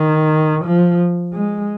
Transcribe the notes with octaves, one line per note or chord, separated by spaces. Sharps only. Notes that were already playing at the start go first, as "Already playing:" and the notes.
Already playing: D#3
F3
G#3